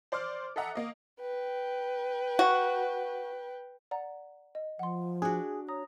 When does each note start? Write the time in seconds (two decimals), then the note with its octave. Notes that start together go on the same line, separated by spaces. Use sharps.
0.12 C5 D5 C6 D6 F6
0.56 A4 D#5 E5 F#5 A#5
0.75 A#3 D#5
1.21 B4 G5
2.39 F#4
3.91 D5 F#5 A#5
4.55 D#5
4.79 F3 F#5 C6
5.22 D4 F#4 G#4
5.69 C#5 A#5 D#6